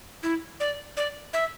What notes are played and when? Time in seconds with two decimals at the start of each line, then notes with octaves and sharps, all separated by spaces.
0.23 E4
0.60 D5
0.97 D5
1.33 E5